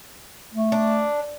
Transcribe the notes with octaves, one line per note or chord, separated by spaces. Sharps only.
A3
D4